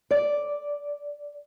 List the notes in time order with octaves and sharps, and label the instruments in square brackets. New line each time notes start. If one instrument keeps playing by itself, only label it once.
[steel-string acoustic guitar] D5